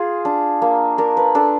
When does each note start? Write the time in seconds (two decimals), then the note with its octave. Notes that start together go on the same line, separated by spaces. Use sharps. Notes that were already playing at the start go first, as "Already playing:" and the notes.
Already playing: F4 G#4
0.25 D4
0.62 A#3
0.98 D4 A#4
1.17 B4
1.35 D4 A4